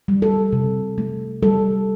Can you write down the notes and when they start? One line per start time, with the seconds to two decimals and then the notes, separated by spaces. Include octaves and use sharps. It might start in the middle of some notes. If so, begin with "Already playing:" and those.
0.08 G3
0.22 A4
0.53 C3
0.98 A3
1.42 G3 A4